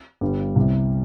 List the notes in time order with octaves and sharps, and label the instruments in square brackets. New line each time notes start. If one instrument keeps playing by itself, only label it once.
[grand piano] G1 G2 D3 G3
C2 C3